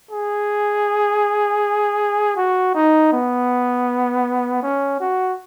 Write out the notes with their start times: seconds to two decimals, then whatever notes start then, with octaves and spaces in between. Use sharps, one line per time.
0.11 G#4
2.37 F#4
2.75 D#4
3.12 B3
4.63 C#4
5.00 F#4